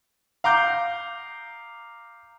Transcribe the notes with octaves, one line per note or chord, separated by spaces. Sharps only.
F5 A#5 D6 G6